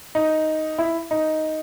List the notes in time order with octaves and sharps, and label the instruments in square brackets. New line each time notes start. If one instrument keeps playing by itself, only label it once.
[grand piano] D#4
E4
D#4